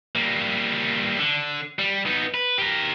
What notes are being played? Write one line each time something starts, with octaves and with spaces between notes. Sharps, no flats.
G3 A#3
D3
G3
B3 D#4
B4
G4 A#4